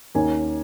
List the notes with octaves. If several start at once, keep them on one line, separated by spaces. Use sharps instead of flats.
D#2 D#3 A#3 C#4 G#5